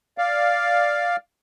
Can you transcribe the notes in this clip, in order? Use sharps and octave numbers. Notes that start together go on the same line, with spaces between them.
D5 F5